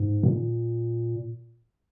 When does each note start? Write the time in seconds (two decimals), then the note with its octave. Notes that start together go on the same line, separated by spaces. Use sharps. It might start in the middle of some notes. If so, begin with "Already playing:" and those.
Already playing: G#2
0.23 A#2